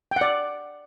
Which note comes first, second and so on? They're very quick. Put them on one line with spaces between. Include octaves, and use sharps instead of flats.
G5 F#5 D5